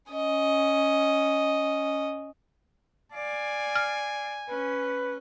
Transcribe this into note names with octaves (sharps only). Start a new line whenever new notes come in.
C#4 D#5
D5 F5 G#5
F6
C#4 B4